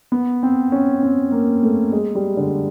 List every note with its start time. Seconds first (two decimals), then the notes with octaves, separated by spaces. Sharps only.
0.12 B3
0.43 C4
0.72 C#4
1.03 C4
1.32 A#3
1.63 A3
1.92 G#3
2.15 G3
2.37 D3